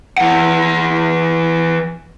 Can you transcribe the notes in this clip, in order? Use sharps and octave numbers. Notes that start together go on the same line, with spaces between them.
E3 F#5